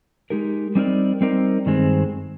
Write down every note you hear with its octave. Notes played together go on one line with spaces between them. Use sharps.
G#3 D#4 G4 A#4
G3 C4 D#4 A#4 D5
G3 C4 D#4 A#4 D5
G2 D#3 G#3 C4